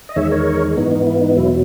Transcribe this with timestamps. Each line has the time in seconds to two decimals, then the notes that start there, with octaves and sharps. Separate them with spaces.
0.09 D#5
0.16 E2 D#3 G#3 C#5 E5
0.31 A#4 C#5
0.77 G#2 E3 B3 D#4
0.91 D#4
1.07 E4
1.21 D#4
1.36 E2 B2 F#3 E4